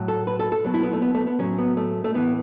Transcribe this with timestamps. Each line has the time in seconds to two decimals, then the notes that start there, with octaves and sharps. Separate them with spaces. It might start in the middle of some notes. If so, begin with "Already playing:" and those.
Already playing: A2 F#3
0.08 A4
0.27 B4
0.39 A4
0.52 A4
0.64 B2 F#3
0.74 E4
0.83 B3
0.93 A3
1.02 B3
1.15 A3
1.27 B3
1.39 A2 F#3 C#4
1.58 B3
1.77 A3
2.04 A3
2.14 A2 E3 B3